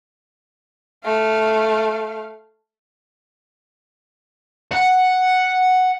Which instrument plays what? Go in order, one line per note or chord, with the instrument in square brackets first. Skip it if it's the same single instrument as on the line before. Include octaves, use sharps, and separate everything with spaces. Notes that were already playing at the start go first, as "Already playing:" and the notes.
[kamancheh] A3 F5
[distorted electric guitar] F#5